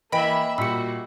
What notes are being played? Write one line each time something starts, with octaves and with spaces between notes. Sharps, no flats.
E3 A#3 D#5 E5 G5 B5
A#2 G3 F#4 E6 C#7